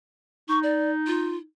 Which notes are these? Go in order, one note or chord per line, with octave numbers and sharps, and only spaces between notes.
D#4 C#6
D5
F4